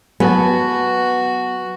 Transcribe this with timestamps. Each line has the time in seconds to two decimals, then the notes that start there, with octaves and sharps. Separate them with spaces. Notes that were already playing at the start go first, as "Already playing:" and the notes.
0.20 F#3 B3 F#4 G#5 A5